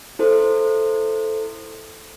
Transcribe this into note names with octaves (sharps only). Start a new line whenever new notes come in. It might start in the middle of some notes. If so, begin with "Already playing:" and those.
E4 A4 C5